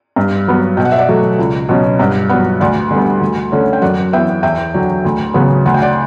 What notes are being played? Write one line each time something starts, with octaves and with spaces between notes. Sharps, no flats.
G2
F#3 B3
B2 G5
F#5
E5
D5 F#5
F#3 A3
C#2
B2 F#3 C#4
G2 D5 F#5
F#3 B3 D5 F#5
D2 D5 F#5
D3 G3 B3
D2
D3 A3 C#4
G5
F#2 D5 F#5
E3 B3 E5 G5
E2 E5 G5
D3 F#3
D2
C#3 F#3 B3
D2 F#5
G5
D5 F#5